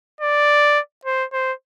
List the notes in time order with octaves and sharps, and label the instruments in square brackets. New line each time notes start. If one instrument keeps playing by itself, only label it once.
[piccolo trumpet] D5
C5
C5